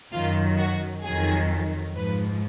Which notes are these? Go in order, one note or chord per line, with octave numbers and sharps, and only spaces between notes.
F#2 D#3 F#3 F4
F#4
F2 D#3 F#3 G#4
G#2 F3 B4